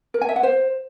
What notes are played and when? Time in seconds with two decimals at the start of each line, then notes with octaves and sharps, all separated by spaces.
0.14 A#4
0.21 G#5
0.29 E5
0.36 F#5
0.43 C5